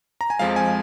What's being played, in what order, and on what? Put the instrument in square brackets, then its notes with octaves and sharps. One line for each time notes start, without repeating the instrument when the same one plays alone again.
[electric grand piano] A#5
G#5
F2 F3 G#3 F5
G#5